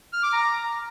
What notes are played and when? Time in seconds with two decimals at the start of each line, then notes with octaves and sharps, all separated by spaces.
0.13 F6
0.23 D6
0.33 A#5